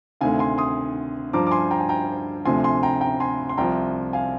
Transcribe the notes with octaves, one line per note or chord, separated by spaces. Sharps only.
D2 C3 D#3 F5 G#5
G#5 C6
C6 D#6
G2 F3 A#5 D6
D6
G#5 C6
G5 A#5
G#5
G5 A#5
D2 C3 F3 G#5 C6
G#5 C6
G5 A#5
G5 A#5
G#5 C6
C6
C2 C3 F3 G5 A#5
F5 G#5